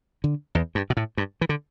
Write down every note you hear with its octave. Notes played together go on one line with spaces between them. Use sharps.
D3
E2
G2
B2
A2
G2
E3
D3